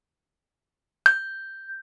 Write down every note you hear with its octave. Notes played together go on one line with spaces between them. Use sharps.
G6